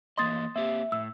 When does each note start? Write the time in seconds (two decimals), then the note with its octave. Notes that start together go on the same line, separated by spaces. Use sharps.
0.18 E3 A#3 D#5 C6 D#6 A6
0.56 A#3 C4 G4 E5
0.92 A2 E6